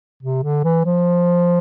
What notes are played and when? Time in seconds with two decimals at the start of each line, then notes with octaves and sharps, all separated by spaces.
0.23 C3
0.43 D3
0.64 E3
0.85 F3